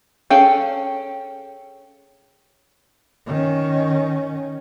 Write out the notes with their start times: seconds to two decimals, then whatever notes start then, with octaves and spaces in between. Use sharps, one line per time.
0.30 C#4 G#4 A4 F5 G5
3.26 D#3 C#4